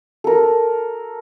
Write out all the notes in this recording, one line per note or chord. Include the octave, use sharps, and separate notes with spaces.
A4 A#4